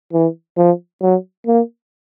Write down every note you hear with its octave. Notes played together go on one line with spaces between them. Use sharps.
E3
F3
F#3
A#3